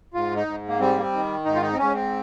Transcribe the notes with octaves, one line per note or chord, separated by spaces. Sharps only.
G#2 F4
D#4
G#2
A#3
G3 C4
A#3
C4
D#3
G#2 D#4
F4
D#4
C4
G#2 C#4
C4